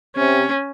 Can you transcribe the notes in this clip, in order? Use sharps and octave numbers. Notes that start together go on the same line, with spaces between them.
C3 C#4